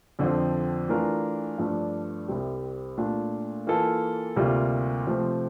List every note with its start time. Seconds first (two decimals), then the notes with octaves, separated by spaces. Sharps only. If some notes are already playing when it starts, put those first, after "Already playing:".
0.19 F2 D3 F3 C4
0.89 E3 A3 D4 F4 A#4
1.58 G2 F3 A3 D4
2.28 C2 C3 G3 C4 G4
2.97 A#2 A3 D4 F4
3.67 E3 A#3 F4 A4
4.36 D2 C3 G3 A#3 F4
5.07 C3 F3 A3 C4